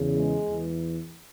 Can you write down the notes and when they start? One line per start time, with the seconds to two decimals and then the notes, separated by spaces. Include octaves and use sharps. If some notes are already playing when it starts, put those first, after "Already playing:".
Already playing: E2 C#3 E3
0.17 G#3
0.48 E2 E3